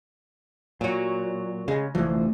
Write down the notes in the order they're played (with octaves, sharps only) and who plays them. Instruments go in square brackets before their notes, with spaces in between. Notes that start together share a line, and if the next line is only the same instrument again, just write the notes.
[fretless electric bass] A#2 [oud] F#3 F#4
[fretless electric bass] C#3 [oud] G#3
[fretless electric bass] F1 E3 F3 [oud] D2